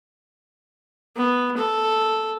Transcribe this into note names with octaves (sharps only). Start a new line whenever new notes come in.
B3
A4